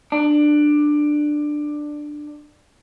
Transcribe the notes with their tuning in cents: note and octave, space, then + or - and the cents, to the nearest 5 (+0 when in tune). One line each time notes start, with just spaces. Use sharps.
D4 +15